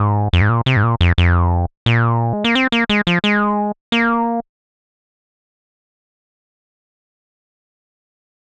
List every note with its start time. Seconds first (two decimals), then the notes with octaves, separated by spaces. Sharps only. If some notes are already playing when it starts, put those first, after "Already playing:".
Already playing: G#2
0.33 F2
0.41 G#2
0.49 A#2
0.66 C3
0.77 G#2
0.83 A#2
1.01 F2
1.18 F2
1.86 A#2
2.33 G#3
2.44 A#3
2.55 C4
2.72 A#3
2.89 G#3
3.07 F3
3.24 G#3
3.92 A#3